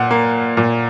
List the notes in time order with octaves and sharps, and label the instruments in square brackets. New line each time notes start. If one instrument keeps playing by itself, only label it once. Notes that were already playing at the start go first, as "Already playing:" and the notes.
Already playing: [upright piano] A#2 F#5
A#3
A#2